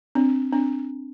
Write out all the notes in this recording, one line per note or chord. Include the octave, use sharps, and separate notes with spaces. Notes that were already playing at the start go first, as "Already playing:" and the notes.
C4 D4
C4 D4